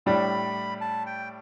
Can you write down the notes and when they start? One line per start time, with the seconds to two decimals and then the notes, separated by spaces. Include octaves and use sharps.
0.06 A2 G3 D4 B5
0.81 A5
1.06 G5